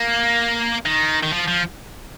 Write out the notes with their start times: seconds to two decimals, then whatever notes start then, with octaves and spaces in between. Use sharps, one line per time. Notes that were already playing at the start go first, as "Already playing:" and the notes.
Already playing: A#3
0.86 D#3
1.23 D#3
1.33 F3
1.48 F3